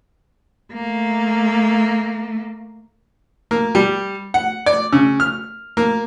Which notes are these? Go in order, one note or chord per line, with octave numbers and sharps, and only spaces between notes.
A3 A#3
A#3
G3
F#5
D5
C#3
F6
A#3